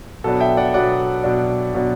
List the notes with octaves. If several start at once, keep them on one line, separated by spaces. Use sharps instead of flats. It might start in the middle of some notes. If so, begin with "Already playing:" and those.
B2 F#3 B3 D4 A4
E5 G5
D5 F#5
B2 F#3 B3 D4 D5 F#5
B2 F#3 B3 D4
B2 F#3 B3 D4